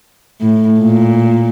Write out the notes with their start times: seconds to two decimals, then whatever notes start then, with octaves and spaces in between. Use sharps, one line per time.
0.41 A2
0.81 A#2